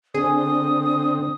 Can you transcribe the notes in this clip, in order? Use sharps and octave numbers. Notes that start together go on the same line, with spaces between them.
D3 C4 G#4 D#6